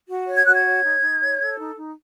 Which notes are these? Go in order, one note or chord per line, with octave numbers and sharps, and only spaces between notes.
F#4
C#5
G#6
F#4 F#6
G#6
C#5
D#4
D#4
C#5
A4
D#4
D#4